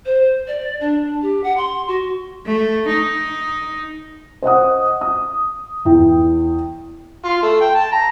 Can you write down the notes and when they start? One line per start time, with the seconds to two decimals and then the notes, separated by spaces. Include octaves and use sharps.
0.05 C5
0.47 D5
0.80 D4
1.22 G4
1.43 F#5
1.57 C6
1.88 F#4
2.45 A3
2.88 D#4
4.42 C5 D#5 F#5 D#6
5.01 D#6
5.85 E2 E4 G5
7.25 F4
7.43 A3
7.61 G5
7.75 A5
7.92 A#5